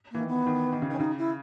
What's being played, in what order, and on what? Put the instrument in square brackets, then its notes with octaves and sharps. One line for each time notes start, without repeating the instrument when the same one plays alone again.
[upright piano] E3 [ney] A#3
[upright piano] D#3
[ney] B3
[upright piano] D#3
D#3
C#3
[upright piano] D#3 [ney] C#4
[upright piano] C#3 [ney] D#4
[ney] E4